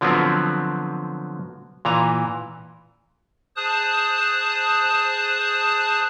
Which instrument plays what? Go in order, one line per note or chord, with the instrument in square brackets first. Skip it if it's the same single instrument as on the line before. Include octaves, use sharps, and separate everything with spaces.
[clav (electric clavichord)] D3 F3 F#3 B3 C4
A#2 E3 A#5
[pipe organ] G#4 C5 A5 D#6 F#6